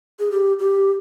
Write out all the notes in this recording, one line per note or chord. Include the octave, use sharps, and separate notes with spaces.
G#4
G4
G4